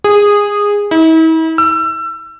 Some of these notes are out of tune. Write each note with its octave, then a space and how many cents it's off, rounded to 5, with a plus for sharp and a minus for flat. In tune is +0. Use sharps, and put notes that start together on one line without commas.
G#4 -15
E4 -45
E6 +30